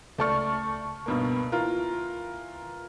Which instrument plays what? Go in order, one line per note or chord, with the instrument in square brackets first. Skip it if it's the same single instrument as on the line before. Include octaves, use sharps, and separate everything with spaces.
[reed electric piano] C#2 A5 C#6 [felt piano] A3 D5 F6
[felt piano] G2 B2 A#3
E3 F4 A#4